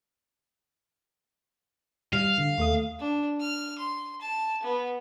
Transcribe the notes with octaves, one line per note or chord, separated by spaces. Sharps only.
G3 F5
D3
D#2 A3 D#6
D4
F6
C6
A5
B3